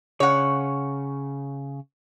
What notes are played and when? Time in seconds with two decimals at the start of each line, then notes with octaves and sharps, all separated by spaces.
0.20 C#3 C#5 F#5